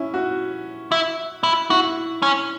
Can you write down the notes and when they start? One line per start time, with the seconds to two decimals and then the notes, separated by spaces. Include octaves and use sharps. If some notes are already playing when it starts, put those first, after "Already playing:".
Already playing: C#4 E4
0.14 F#4
0.92 E4
1.43 E4
1.70 E4 F#4
2.22 C#4